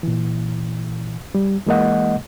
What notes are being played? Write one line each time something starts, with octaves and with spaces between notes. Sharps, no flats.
A#2 E3
G3
E3 G#3 A#3 D#5 F#5